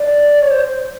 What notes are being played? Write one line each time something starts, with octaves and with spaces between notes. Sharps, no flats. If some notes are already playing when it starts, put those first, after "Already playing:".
Already playing: D5
C#5
C5